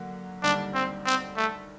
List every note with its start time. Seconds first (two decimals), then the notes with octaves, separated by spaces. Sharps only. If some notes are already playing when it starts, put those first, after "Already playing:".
Already playing: D3 F#3 A#3 F#4
0.43 D#2 D3 G3 D4
0.74 C4
1.05 C4
1.37 A3